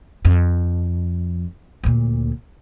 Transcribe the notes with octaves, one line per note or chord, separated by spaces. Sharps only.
F2
D2 A#2